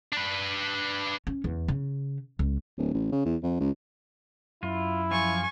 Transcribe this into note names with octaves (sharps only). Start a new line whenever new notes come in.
D4 B4
C#4
E2
C#3
C#2
D1
A1
C#3
E2
F2
C#2
F#2 E4 F4
F3 F4 G#5 C#6